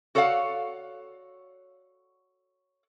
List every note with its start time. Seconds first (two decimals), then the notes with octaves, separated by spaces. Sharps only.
0.15 F#4 A4 C#5 D5 F5 F#5